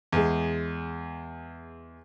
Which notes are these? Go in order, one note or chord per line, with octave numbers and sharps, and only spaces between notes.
E2 G#3